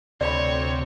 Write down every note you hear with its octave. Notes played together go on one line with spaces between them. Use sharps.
D2 C3 C#5 D5 B5